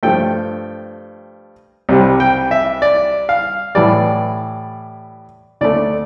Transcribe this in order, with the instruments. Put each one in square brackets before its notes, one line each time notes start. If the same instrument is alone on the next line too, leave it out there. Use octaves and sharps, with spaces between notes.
[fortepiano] G2 F3 A3 G5
C2 C3 G3
G5
E5
D5
F5
A2 E3 G3 D5
D2 D3 A3 D5